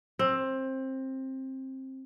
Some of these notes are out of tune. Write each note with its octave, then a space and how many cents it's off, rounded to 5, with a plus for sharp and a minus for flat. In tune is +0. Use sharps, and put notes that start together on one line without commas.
C4 +20